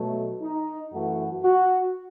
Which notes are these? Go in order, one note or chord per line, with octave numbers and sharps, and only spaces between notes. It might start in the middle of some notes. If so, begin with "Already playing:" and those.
Already playing: B2 F#3 A3
D#4
F#2 E3 A3 F#4
F#4